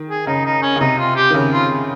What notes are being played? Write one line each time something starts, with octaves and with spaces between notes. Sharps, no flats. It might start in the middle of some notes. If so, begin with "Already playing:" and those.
Already playing: D#3
G#4
C#3 D#4
D#4
C#4
C#3
C3 D#4
F4
G4
D#3
C#3
F4